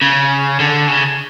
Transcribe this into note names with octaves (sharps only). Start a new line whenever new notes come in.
C#3
D3
C#3